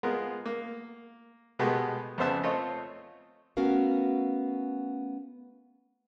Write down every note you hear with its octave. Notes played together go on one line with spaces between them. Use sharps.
G#3 B3 F4 A#4
A#3
B2 G#3 A3 B3 G4
F2 C#3 B3 C5 E5 A5
A3 C4 F4 C5 C#5 D#5
A3 B3 C#4 F#4 A#4 F5